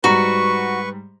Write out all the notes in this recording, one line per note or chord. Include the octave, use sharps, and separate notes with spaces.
G#2 G3 F#4 B4 A#5 C#6